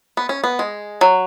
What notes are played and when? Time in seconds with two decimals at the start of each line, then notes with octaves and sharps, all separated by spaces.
0.17 B3
0.29 C#4
0.44 B3
0.59 G#3
1.01 F#3